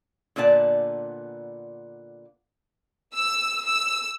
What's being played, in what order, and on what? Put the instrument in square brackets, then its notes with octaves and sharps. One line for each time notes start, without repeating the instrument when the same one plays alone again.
[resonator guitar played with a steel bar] A#2 D3 B3 D5 A5
[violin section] E6
E6